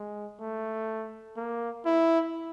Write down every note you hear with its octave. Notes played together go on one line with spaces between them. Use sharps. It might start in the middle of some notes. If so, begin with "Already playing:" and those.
Already playing: G#3
A3
A#3
E4